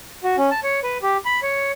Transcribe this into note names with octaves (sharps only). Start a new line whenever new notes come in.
F#4
C#4
A5
C#5
B4
G4
B5
C#5